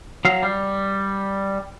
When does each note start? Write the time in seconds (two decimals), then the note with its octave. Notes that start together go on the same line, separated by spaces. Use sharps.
0.25 F#3 F5
0.43 G3